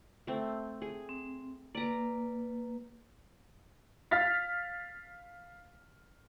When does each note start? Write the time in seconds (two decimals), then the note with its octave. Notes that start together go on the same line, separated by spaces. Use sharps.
0.27 A3 C4
0.82 G#4
1.09 C4
1.75 A#3 B4 D5 A#5
4.11 F5 F6 A6 B6